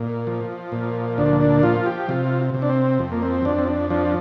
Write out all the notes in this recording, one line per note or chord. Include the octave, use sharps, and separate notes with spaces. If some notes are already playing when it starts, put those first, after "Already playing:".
Already playing: A#2
F3
A#2
D2 D4
D4
F3 F4
G4
C3 F4
C3
D4
C4
F2
A#3
C4
F2 D4
C4
D4
F3 D4